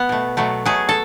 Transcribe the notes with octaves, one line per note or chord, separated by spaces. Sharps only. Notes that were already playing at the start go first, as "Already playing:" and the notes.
Already playing: B3
B2 A3
B2 F#3 A3
B2 F#3 A3 G#4
A4